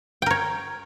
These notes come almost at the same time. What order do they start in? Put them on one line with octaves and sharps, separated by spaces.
G5 A#4 C#5